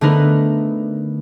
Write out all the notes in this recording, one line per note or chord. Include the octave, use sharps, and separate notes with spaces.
D3 A3 B3 D#4 A#4 B4